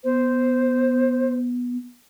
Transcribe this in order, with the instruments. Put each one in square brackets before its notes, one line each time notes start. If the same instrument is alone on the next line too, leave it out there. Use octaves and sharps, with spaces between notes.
[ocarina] B3 [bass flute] C5